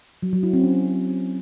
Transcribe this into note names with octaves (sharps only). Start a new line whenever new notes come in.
F#3
F#3
E4
C4
C#4